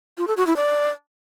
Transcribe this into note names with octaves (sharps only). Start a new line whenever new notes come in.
F4
A4
F#4
E4
D5